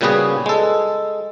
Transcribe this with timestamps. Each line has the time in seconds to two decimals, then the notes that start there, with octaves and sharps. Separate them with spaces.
0.01 A#2 C#3 G3 B3 F#4 G#4
0.46 G#3 A4